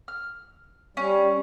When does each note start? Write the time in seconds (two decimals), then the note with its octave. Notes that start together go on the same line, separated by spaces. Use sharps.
0.08 F6
0.97 G3 C#4